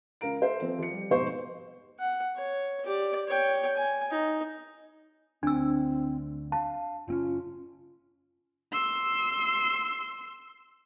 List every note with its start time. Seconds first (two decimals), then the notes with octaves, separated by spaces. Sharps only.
0.21 C#2 A#4 F5 A#5 D7
0.41 A4 C5 E5
0.61 F3 C4
0.79 F3 C#7
0.91 G3
1.10 F1 G#2 B2 D#4 C5 C#6
1.99 F#5
2.36 C#5
2.85 G4 D5
3.28 C#5 G5
3.77 G#5
4.11 D#4
5.43 D2 C4 D4 E6
6.52 F5 A5
7.08 F#1 C4 C#4 F4
8.72 C6 E6